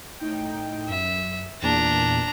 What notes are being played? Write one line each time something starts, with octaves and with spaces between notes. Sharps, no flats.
A2 D#4 G5
F#2 E5
E2 A#2 D4 A#5